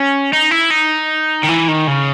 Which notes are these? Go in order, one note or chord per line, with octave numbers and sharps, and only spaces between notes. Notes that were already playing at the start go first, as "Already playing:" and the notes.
Already playing: C#4
D#4
E4
D#4
D#3
E3
D#3
C#3